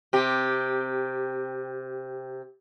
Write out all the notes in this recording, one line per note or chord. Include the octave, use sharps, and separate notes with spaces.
C3 G4